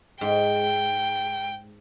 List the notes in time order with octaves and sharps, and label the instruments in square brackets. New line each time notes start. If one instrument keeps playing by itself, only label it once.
[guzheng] G#2 [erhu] G5